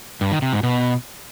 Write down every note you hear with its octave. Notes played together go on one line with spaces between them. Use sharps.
G2
D#3
C3
G#2
B2